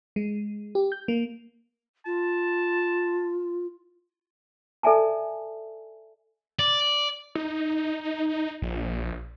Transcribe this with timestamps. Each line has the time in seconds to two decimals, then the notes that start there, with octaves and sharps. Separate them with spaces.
0.16 G#3
0.75 G4
0.92 G6
1.08 A#3
2.06 F4 A5
4.83 A4 D5 E5 G#5 A5
6.59 D5
7.35 D#4
8.62 A#1